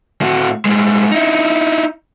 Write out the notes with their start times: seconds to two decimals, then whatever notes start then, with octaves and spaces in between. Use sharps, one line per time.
0.21 A2 F#4
0.65 A2 G#3
1.12 D#4 E4